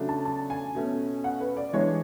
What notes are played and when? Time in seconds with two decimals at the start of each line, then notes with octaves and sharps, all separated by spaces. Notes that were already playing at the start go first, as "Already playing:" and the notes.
Already playing: C#3 F#3 A3 D4
0.09 A5
0.25 A5
0.50 G#5
0.75 B2 A3 C#4
1.24 F#5
1.40 B4
1.57 D5
1.73 E3 G#3 D4 C#5